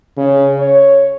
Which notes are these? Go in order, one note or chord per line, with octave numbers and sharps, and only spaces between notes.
C#3
C#5